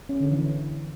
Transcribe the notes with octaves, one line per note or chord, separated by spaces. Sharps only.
C#4
D3
E3